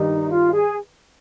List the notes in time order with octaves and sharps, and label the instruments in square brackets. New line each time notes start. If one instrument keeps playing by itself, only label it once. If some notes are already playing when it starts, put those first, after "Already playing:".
Already playing: [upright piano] G2 D#3 G3 [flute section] D#4
[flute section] F4
G#4